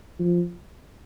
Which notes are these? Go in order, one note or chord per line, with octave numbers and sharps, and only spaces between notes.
F3